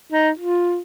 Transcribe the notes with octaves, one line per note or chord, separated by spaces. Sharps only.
D#4
F4